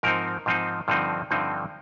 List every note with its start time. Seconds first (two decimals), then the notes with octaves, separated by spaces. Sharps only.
0.03 G#2 F3 C4 D#4 A#4
0.46 G#2 F3 C4 D#4
0.88 G2 D3 F3 C4 D#4
1.31 G2 D3 F3 C4 D#4